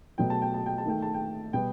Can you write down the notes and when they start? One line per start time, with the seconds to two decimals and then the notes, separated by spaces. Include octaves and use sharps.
0.18 B2 F#3 A3 G5
0.30 A5
0.42 G5
0.54 A5
0.66 G5
0.78 A5
0.85 D#3 A3 G5
1.02 A5
1.14 G5
1.53 B2 G3 B3 G5